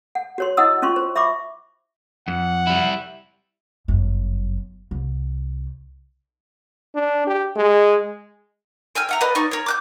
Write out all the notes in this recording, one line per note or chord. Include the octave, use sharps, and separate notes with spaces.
F#5
F#4 C#5 C6
E4 D#5 F#5 D#6 E6
C#4 F4 C6 C#6
C5
E5 B5 C#6 D6
F2 F#5
G3 E4
G1 F#2
C2
D4
G4
G#3
G5 G#5 E6 F6
E5 F#5 A#5
B4 D5 D#5
D#4 D5 C#6
A#4 C#5
D6 F#6 G6